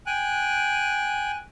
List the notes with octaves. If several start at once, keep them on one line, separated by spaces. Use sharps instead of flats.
G5 G#5 F#6